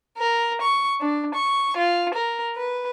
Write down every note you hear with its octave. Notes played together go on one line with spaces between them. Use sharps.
A#4
C#6
D4
C#6
F4
A#4
B4